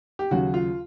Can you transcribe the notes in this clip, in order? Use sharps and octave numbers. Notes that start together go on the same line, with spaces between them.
G4
D#2 C#3 F#3 F#4
F4